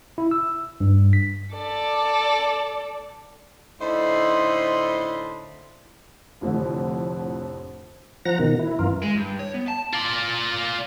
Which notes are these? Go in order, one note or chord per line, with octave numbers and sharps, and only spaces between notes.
E4
E6
G2
B6
A4 D5
A2 D3 D#4 C5 B5 C6
F1 F2 A2 D3
F3 F#5 A#5 A#6
B2 D#3
E4
F#2 E3 F4 A#4
G#3
G2
C#5
B3
A5
F4 D5